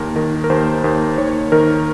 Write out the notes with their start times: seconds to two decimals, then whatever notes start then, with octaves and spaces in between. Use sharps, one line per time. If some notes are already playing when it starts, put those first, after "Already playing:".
Already playing: D#2 A#4
0.16 D#3 A#4
0.44 A#4
0.50 D#2 C5
0.84 D#2
1.18 D#2 C#5
1.52 D#3 A#4